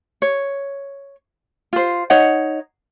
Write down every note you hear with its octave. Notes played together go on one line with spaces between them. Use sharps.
C#5
F4 C5
D#4 C#5 D#5 F#5